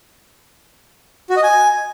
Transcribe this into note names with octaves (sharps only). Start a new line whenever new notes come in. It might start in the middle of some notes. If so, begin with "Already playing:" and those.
F#4
D#5
G#5